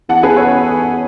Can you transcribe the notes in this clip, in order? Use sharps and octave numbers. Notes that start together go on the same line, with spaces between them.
E2 F#5 A5
G#4 B4
A4 C#5